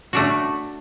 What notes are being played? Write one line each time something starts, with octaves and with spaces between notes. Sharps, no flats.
A3 D4 F#4